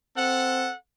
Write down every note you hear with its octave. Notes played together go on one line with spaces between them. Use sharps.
C4 A4 F#5